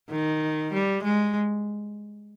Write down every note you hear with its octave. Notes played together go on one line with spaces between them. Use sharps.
D#3
G3
G#3